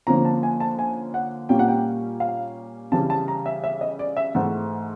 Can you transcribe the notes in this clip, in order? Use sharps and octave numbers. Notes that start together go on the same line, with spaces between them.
D3 F3 A#3 C#4 A#5
A5
G#5
A5
G#5
F#5
A#2 G3 A#3 C#4 G5
F#5
G5
F5
C#3 E3 G3 A5
A5
A#5
E5
E5
D#5
D5
E5
G#2 E3 A3 F#5